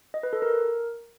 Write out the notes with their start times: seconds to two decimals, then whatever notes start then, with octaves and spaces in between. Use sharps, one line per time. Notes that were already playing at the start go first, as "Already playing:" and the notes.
0.14 D#5
0.23 B4
0.33 A4
0.42 A#4